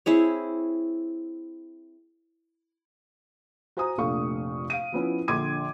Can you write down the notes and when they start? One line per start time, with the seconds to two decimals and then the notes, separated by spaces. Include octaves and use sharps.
0.06 C4 E4 G#4 C#5
3.77 F#4 C5 G#5 A#5 D#6
3.98 F1 A#2 A3 D4 F5 C#6
4.70 F5 D7 D#7
4.92 F3 B3 C#4 E4
5.28 A#1 D3 C6 D6 G#6 D#7